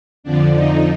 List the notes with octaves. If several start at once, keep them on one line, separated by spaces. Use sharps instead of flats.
F2 D3 F3 D4
D#4